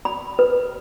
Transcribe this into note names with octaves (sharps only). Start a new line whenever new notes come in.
B5
B4